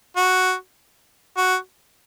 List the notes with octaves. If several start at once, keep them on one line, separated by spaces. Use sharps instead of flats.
F#4
F#4